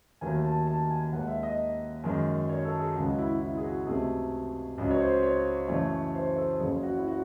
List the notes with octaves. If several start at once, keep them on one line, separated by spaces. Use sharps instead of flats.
D#2 D#3 F#3 A3 G#5
A5
A5
G#5
D#2 D#3 G#3 F#5
E5
D#5
F#2 D#3 G#3
C#5
A4
G#4
C#2 C#3 G#3 F#4
F#4
E4
E4
G#4
F#4
C#2 C3 F#3 A3 G#4
C#2 C#3 F#3
C#5
C5
C#5
F#2 C#3 E3 A3 C#5
C5
C5
A4
F#1 F#2 C#3 G#4
F#4
E4
F#4